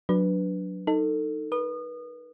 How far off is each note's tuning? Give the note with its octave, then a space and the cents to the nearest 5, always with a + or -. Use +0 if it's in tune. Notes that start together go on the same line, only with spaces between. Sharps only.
F#3 -10 D4 +0 B4 +0
D#4 +0 A4 +25
B4 -30 D#6 -30